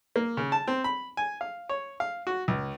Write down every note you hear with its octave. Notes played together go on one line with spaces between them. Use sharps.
A#3
C#3
A5
C4
B5
G#5
F5
C#5
F5
F#4
C#2